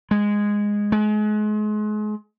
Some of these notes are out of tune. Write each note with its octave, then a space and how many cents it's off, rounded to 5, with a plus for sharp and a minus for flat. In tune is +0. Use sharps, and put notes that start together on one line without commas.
G#3 -10
G#3 +35